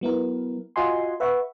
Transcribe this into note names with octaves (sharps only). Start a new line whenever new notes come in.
F#3 B3 E4 A#4
F4 F#4 D#5 F#5 G#5 C6
B4 E5 F#5 C#6